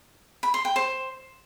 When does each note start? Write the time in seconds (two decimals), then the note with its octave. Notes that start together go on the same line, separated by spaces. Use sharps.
0.43 B5
0.54 C6
0.65 G5
0.76 C5